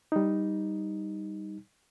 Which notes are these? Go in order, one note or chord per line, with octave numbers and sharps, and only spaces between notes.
G3 D#4